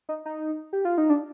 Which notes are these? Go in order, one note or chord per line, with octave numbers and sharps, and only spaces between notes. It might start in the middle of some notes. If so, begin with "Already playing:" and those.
D#4
D#4
G4
F4
D#4
D4